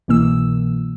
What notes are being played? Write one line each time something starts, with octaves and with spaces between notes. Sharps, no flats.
C2 B2 E3 A#3 E6